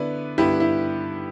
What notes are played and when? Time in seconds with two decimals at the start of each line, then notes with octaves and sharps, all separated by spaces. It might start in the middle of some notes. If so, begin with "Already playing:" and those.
Already playing: D3 B3 E4 B4 D5
0.38 G2 D3 B3 E4 G4 B4
0.60 E4